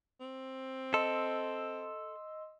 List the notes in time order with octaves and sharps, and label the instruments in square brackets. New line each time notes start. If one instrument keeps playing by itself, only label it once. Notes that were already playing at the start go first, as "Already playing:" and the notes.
[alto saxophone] C4
[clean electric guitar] A4 [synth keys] D#5 C6 E6